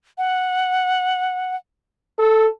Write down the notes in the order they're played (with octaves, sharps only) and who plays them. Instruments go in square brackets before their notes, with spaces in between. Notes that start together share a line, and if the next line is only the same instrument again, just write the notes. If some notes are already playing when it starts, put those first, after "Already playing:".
[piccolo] F#5
[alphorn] A4 [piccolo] E6